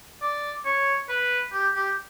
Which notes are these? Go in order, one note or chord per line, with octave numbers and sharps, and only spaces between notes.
D5
C#5
B4
G4
G4